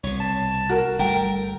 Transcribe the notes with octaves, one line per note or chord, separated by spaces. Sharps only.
C2 B2 C#5
A5
F#4 A#4
G1 G3 A3 A#4 G5